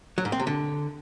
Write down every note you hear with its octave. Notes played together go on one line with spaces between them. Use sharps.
F#3
G#2
C4
C3
D3